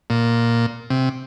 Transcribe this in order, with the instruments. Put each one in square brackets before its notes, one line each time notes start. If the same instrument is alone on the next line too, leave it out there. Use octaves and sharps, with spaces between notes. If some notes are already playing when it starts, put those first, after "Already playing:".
[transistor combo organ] A#2
C3